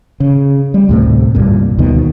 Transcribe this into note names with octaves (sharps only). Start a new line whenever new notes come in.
C#3
G3
D2 A2 C3
C2 G2 A#2
D2 B2 D#3